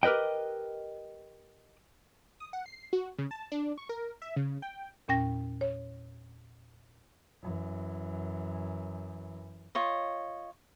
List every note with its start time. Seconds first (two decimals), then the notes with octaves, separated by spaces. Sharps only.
0.03 G4 A#4 B4 D#5 G5
2.40 D#6
2.53 F#5
2.66 C7
2.93 F#4
3.18 C#3
3.31 A5
3.52 D4
3.78 C#6
3.89 A#4
4.22 E5
4.36 C#3
4.62 G5
5.08 E2 A#2 C#4 G5 A#6
5.61 C#5
7.42 F#2 E3
9.75 F4 C#5 D#5